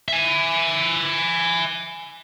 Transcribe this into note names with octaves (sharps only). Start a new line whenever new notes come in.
E5 G#5